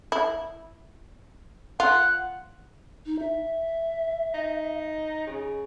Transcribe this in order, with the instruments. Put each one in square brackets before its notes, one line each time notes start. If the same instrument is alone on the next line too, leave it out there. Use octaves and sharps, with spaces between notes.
[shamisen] E4
[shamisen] F4 [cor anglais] F#5
[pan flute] D#4
E5
[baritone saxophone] D#4
C#3